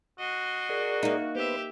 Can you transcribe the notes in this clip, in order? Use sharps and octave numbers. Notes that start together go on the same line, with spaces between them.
F#4 D#5 C7
G#4 A#4 D5
A#3 D#4
B3 G4 B4 C5 E5